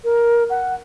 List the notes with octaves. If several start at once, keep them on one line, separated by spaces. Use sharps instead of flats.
A#4
F#5